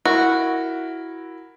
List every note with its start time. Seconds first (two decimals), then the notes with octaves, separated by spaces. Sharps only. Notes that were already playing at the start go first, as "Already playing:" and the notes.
0.05 E4 F#4 A#4